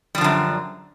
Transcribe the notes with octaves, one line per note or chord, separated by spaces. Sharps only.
F#2 D3 F3 G3